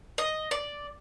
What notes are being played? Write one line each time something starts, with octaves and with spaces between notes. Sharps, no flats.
D#5
D5